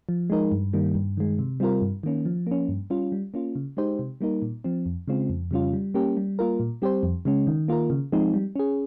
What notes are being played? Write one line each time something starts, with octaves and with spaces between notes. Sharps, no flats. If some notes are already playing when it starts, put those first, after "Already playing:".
F3
G#3 D#4 A#4
G2
D#3 G3 A#3
G2
D#3 G#3
C3
G3 C4 F4 A#4
G2
D#3 A#3 C#4
F3
A#3 C#4
G2
G3 C#4 F4
G3
A#3 C#4 F4
C#3
G#3 D#4 G4 C5
C3
G3 A#3 D#4 A#4
A#2
F3 C4
F2
C#3 G#3 C4 F4
F2
C#3 G3 C#4 F4
G3
A#3 C#4 G4
G3
A#3 F4 A#4
A#2
G3 C4 G4 C5
F2
C#3 G#3 C#4
D#3
A#3 F4 A#4
C#3
F3 G#3 C4 D#4
G3
C#4 G#4